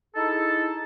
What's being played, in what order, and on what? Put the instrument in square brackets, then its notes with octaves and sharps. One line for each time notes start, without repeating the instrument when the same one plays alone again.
[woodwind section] D#4 E4 G#4 A4